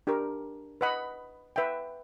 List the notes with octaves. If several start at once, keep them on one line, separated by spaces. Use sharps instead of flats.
D4 G4 A#4
B4 D#5 F#5 B5
B4 E5 G5